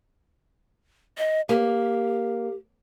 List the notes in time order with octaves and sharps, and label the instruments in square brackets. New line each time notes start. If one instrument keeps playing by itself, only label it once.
[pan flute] D#5
[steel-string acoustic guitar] A#3 [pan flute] G4